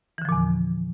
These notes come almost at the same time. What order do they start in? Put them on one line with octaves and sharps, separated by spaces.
E3 D3 F3 A#2 E2